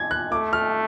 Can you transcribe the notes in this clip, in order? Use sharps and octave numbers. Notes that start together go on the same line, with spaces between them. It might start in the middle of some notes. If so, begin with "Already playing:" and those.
Already playing: G#6
F#6
A3 D6
F6